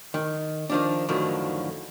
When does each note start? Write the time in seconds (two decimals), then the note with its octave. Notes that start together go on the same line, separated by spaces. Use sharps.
0.14 D#3
0.70 D#3 F3 D4
1.09 F#2 A2 D3 D#3 F3